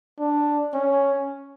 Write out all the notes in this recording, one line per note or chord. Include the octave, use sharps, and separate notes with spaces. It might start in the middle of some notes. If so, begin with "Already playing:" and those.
D4
C#4